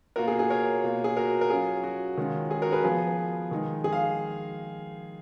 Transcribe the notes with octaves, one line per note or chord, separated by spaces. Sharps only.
B2 A#3 F4 F#4 A#4
G#4
G#4
A#4 C#5
B2 A#3 F4
G#4
F#4 A#4
A#4
F#3 C#4 F4 G#4
F#4
D#3 G#3 C#4 F4
G#4
F#4 A#4
G#4 B4
F3 B3 F4 G#4
D#3 G#3 D#4
G#4
F5